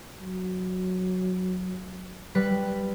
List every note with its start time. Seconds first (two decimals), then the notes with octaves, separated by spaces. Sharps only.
0.21 F#3
2.35 G3 B4